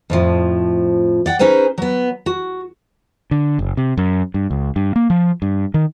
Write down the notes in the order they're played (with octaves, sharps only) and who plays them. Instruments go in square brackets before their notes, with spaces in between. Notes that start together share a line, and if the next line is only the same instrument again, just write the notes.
[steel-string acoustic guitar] F2 A2 F3
D5 F#5 G5
C#4 D#4 G#4 B4 C5
F#3 B3
F#4
[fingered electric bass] D3
F#1
C3
F#2
G2
C#2
G2
A#3
F3
G2
D#3